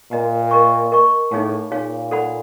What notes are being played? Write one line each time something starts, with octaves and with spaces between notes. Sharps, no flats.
A#2 A#4 D#5 G#5
A#4 D#5 G#5 C#6
A#4 D#5 G#5 C#6
A2 D#4 G#4 C#5 F5 G#5
A#2 D#4 G#4 C#5 F5 G#5
A4 D5 F#5 B5